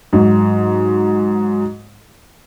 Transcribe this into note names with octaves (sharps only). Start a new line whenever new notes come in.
G#2 F#3